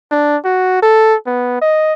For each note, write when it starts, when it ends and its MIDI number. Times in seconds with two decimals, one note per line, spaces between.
0.11 0.37 62
0.44 0.82 66
0.82 1.15 69
1.26 1.57 59
1.61 1.93 75